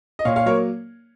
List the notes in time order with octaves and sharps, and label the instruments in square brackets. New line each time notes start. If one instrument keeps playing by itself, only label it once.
[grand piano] D#5
A#2 C#5 F5
C#5 F5
F#3 A#3 A#4 C#5